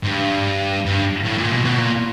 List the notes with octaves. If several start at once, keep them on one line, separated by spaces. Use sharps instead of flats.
G#2
G2
G2
A2
A#2
B2
B2
A#2